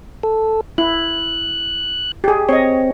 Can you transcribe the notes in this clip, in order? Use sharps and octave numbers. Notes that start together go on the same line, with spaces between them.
A4
E4 F#6
G4 G#4
C4 C#5 D#5